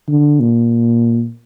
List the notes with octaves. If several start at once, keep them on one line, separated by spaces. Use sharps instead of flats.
D3
A#2